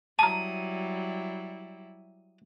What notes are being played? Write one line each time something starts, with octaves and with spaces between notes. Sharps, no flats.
F#3 G3 E4 A5 A#5 D#6